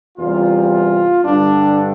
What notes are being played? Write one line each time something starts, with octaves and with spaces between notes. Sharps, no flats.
E2 C3 G3 F4
G2 D3 G3 D4